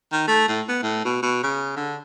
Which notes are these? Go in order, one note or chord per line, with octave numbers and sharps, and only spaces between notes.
D#3
A3
A2
B3
A2
B2
B2
C#3
D3